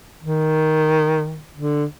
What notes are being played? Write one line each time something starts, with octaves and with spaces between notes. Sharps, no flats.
D#3
D3